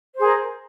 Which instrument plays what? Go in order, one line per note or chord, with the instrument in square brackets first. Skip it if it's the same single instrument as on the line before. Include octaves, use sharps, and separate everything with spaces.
[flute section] C5
G#4
A#4